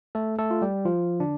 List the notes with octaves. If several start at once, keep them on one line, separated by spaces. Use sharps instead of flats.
A3 A4
A3 A4
F4
G3 G4
F3 F4
D3 D4